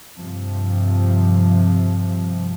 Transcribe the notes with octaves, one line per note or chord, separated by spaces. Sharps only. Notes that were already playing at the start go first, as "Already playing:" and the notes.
G2 C3 F3